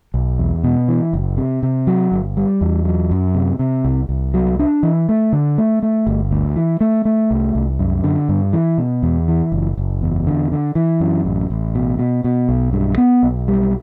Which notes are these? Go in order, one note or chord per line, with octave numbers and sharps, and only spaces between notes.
B1
E2
B2
E3
F#1
C3
C3
F#3
G1
G3
E2
F#3
F#2
C3
C3
C2
C2
F#3
D4
E3
A3
D3
A3
A3
G1
D2
E3
A3
A3
C2
C2
F#2
D3
G2
E3
B2
E2
E3
F#1
F#1
E2
D3
D3
E3
F#2
A1
A1
B2
B2
B2
B1
G2
B3
B1
G3